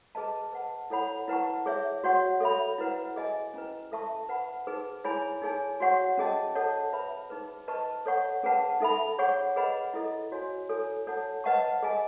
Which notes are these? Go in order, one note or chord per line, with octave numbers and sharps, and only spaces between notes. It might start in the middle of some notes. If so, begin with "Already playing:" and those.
G#4 B4 D#5 A5
B4 F#5 A5
E4 A4 C#5 F#5 B5
E4 B4 F#5 A5 C#6
G#4 C#5 E5
F#4 C#5 F#5 C#6
A4 C#5 E5 B5
E4 B4 F#5
G#4 D#5 G#5
C#4 E4 B4
A4 E5 A5 C#6
B4 F#5 B5
D#4 G#4 B4
E4 G#4 C#5 G#5 B5
D#4 G#4 C#5 G#5
F#4 C#5 F#5 C#6
C#4 G#4 D#5 A5
A4 C#5 F#5 A5
B4 E5 B5
D#4 G#4 B4
B4 D#5 A5 C#6
A4 C#5 F#5 C#6
C#4 G#4 B4 F#5 A5
D#4 A4 E5 B5
G#4 C#5 F#5 C#6
G#4 B4 D#5 F#5 B5
E4 A4 D#5
F#4 C#5 G#5
E4 A4 C#5 G#5
A4 C#5 F#5 A5
B4 D#5 F#5 A5 C#6
G#4 D#5 G#5